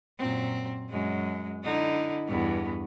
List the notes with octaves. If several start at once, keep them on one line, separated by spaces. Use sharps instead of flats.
F#2 A#2 C4
F#2 G#3
D3 D#4 E4
E2 G2 B3